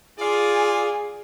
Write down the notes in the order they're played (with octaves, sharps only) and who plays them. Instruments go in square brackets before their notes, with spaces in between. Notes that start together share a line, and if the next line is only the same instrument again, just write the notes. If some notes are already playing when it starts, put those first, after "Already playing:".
[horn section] F4 D5 [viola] G#4